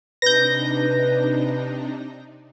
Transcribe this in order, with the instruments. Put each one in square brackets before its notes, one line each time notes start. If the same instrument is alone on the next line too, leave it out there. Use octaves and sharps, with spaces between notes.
[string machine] C3 D4 D#4 [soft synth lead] B4 [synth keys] G6 A#6